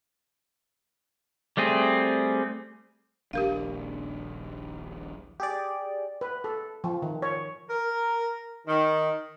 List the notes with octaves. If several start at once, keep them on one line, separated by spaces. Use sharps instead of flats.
G3 A3 C4 G#4
D#1 A#1 D4 G4 A#4 F5
G4 G#4 D5
B4
A4
F3
D#3
C#5
A#4
D#3